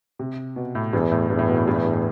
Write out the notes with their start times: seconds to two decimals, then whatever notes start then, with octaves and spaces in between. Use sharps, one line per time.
0.19 C3
0.56 B2
0.75 A2
0.93 E2 G2
1.12 A2
1.30 E2 G2
1.39 A2
1.49 B2
1.58 A2
1.67 G2
1.76 A2
1.85 G2
1.94 A2